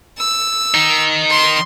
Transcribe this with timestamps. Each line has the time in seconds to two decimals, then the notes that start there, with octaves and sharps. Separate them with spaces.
0.18 E6
0.74 D#3 D#4
1.30 C6